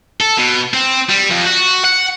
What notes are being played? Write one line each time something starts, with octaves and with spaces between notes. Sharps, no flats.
A4
B2
C4
G3
F2
F#4
F#5